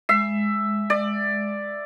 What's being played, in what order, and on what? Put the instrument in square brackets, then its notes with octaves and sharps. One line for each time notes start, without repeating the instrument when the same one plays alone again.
[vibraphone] G#3 [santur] E5
[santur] D5